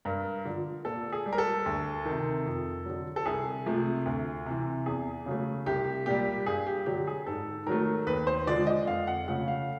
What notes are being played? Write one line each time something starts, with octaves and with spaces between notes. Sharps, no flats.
G2 A#4
D3 F3
A#2 A4
G#4
G3
A#4
A4
D2
C3 D#3
F2
D3 F#3
A4
C2 G#4
C3 F3 A3
D2
C3 E3
E2 G#4
C#3 F#3 A3
C2 G4
A#2 G3 G4
G2 G#4
G4
D3 F#3 G4
G#4
G#2 A4
D#3 F#3 A3 A#4
D#2 B4
C5
D3 F3 G#3 D5
D#5
F2 F5
F#5
C#3 F3 A3 F#5
F5